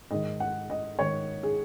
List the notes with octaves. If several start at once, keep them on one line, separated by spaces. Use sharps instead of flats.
G#2 D#3 D#5
F#5
D#5
G#2 D#3 C#5
G#4